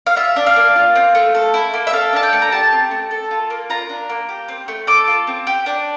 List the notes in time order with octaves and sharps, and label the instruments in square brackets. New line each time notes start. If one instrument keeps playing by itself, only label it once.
[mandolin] F5
F4 E5
D4
F5
A#3
F4
C4
A3
A4
E4
A#3
E5
A4 F5
D4 A5
G5
A3
A#5
G4 A5
C4
A3
A4
F4
A#3
F4 A#5
D4
A#3
G4
C4
A3
A4 D6
F4
C4
G4
D4